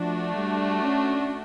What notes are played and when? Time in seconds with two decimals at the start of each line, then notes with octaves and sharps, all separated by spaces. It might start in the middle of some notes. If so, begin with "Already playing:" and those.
Already playing: F3 A3 D4 F#4
0.36 G3
0.83 C#4